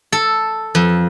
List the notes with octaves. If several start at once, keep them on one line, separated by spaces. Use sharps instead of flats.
A4
F2